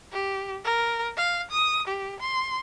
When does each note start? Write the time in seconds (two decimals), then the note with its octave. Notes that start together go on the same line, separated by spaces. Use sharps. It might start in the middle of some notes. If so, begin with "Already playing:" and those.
0.12 G4
0.64 A#4
1.17 F5
1.51 D#6
1.87 G4
2.20 C6